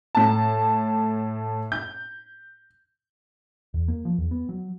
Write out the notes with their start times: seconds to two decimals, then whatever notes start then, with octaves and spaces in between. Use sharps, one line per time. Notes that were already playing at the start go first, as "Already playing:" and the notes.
0.15 A2 A5
1.72 G6
3.74 E2
3.88 A#3
4.05 F3
4.18 E2
4.31 B3
4.49 F#3